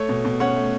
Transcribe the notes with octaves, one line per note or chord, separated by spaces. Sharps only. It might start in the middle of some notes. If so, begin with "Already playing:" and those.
Already playing: A3 A4 C#5
B2
B2
C#4 C#5 F#5
A3